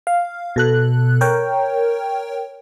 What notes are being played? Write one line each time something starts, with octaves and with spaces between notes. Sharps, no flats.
F5
B2 A4 F#6
A#4 C#5 G5